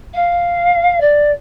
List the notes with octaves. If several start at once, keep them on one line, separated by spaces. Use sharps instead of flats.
F5
D5